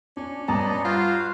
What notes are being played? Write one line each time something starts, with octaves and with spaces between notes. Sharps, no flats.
C#4 D4
G2 D5 D#5 A5 A#5
F4 F#4 C5 F5